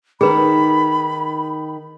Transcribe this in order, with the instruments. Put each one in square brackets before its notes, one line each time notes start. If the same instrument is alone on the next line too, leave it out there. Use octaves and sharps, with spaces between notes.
[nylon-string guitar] D#3 D#4 [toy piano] G#4 B4 [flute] B5